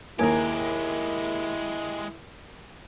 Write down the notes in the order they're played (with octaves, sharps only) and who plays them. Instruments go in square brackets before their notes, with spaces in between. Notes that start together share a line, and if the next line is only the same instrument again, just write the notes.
[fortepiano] D#2 A#3 [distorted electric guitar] G#3 G4 [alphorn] E4 [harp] A#4 G#5